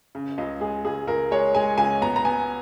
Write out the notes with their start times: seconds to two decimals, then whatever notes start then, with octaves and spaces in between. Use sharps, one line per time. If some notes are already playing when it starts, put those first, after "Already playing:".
0.15 C#3
0.38 C#2 D#5
0.60 G#3 G#4
0.85 C#2 G#4
1.07 C#2 A#4
1.31 G#3 C#5
1.55 G#3 G#5
1.78 C#2 G#5
2.02 B3 A#5
2.16 A#5
2.25 B3 G#5